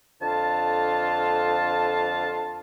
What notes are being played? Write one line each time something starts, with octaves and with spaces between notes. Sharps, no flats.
F2 D3 F4 A5